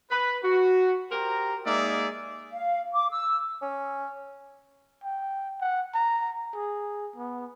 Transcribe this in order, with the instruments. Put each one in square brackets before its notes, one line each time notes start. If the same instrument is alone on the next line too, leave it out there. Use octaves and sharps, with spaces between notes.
[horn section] B4
F#4
G4 A#4 C5 A#5
G#3 A#3 D#4 G#4 D5 E5
[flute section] F5
D6
E6
[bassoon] C#4
[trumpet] G5
F#5
A#5
G#4
B3